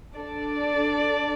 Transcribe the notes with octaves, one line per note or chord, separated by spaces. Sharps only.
D4 A4 D5